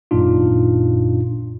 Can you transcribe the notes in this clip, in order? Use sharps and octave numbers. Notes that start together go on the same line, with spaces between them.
G#1 F#2 A#2 D4 D#4 F4